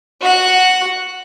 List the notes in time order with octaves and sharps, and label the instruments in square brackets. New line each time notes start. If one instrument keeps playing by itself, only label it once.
[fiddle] F#4 F#5